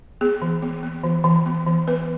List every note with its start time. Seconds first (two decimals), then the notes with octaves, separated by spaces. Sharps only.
0.21 B3 G#4
0.42 E3
0.62 B3
0.83 B3
1.04 E3
1.24 E3
1.46 B3
1.67 E3
1.88 B3 B4